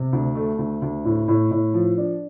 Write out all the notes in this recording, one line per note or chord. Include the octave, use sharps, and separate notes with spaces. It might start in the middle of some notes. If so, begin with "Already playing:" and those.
Already playing: C3
D2
A3
D2
D2
A2
A2
A2
F3
D4